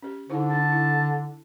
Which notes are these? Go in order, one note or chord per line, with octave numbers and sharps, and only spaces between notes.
C#4 G4
D3 D#4 E4 C5
D4 A4 A5
E4